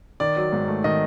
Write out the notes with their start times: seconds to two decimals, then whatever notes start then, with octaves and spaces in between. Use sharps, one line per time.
0.20 D#3 D5
0.36 F#3
0.52 G#2
0.68 A3
0.84 D#3 D#5